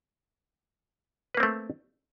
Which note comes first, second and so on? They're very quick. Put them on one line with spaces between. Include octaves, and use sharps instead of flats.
B4 A#3 C4 A3